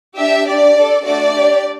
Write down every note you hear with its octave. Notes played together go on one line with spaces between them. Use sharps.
D4 G4 E5
D4 G4 D5
D4 A4
A3 D4 F#4 D5
D4 G4